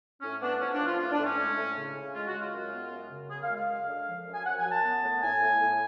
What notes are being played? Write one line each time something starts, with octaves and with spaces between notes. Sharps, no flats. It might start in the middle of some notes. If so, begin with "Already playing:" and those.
A2 C#4
B3 D4
F3 C#4
D4
F3
F4
A2 F4
D4
A2
C#4
G#3
A2
C#3
C#3
G#3 F4
F#4
G#3
F4
F#2
B3
F#2
C#3
F#2 G#4
F5
G#3
F5
F#2
D3
F3
F#2
G#5
F#2 F#5
G#5
F#2
A5
B3
A2
A2 G#5
A2
A2